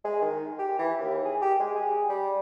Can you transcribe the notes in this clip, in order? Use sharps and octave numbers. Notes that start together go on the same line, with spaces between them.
G#3
D#3
G4
E3
D#2
G#4
G4
G#3
G#4
G3